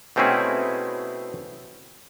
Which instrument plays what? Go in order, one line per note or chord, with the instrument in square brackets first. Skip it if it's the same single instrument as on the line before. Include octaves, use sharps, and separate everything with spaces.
[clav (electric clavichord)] B2 A3 C4 C#4 E4 G#4